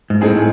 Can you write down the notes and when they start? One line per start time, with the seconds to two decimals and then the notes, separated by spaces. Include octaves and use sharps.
0.10 G#2
0.21 A2 A3 C4 D#4 G#4